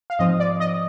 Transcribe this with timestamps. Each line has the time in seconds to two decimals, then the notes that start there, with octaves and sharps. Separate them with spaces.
0.10 F5
0.19 G#2 F3 C4 D#5
0.40 D5
0.60 D#5